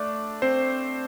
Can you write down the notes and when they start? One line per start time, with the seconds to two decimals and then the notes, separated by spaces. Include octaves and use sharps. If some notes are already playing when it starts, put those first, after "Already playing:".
Already playing: A3 D4 D5
0.42 C4 C5